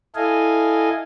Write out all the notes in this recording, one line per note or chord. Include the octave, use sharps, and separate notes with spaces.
E4 A4 D#5 F5 G#5